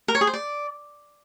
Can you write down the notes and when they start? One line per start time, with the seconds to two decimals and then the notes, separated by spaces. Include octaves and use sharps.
0.08 A#4
0.15 C#5
0.21 G#4
0.27 C5
0.34 D5